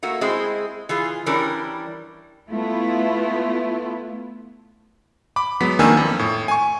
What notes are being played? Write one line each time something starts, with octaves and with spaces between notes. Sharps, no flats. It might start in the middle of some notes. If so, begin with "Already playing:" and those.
A3 A#3 F#4
G#3 C4 E4 G#4
E3 F4 G#4
E3 G3 C#4 D4 A#4
A3 B3 E4 F4
B5 D6
F#3 G#3 B3 B6
F2 D#3 A#3 D4 G#5 E6
F2
A2
G#5 C#6